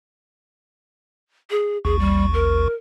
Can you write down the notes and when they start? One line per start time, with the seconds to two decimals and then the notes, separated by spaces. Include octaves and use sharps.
1.51 G#4
1.85 A1 D#2 G#4 C#6
1.99 G3
2.34 A#4